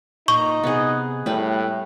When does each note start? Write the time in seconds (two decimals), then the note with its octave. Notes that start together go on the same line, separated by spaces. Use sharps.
0.28 A#2 D#4 A#5 C#6
0.64 C3 B3 G#4
1.26 A2 G3 A3 B4